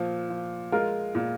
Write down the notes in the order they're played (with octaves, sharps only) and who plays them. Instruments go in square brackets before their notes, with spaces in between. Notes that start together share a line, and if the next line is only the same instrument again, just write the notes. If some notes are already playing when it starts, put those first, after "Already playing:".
Already playing: [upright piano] A#2 F3
F3
G#3 F4 A#4
A#2